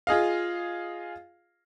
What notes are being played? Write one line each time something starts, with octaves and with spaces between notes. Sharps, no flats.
F4 G#4 D#5 F5